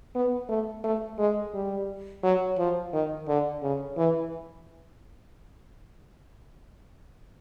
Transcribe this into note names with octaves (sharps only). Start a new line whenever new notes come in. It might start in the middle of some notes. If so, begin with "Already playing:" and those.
B3
A3
A3
G#3
G3
F#3
F3
D#3
D3
C#3
E3